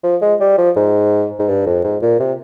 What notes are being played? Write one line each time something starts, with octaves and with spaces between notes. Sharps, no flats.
F3
G#3
G3
F3
G#2
G#2
G2
F2
G#2
A#2
C3